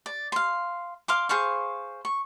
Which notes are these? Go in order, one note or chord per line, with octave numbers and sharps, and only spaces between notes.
D5
F5 C6
F5 C6 D6
G#4 C5 F5 C#6
C#6